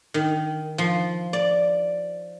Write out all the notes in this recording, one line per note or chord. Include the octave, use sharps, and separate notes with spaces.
D#3
F3
D5